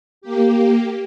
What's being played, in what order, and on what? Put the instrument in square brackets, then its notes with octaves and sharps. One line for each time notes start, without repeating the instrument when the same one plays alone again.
[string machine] A#3 G4